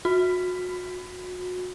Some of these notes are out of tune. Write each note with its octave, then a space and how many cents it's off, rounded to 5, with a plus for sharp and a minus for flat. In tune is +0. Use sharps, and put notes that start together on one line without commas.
F#4 -30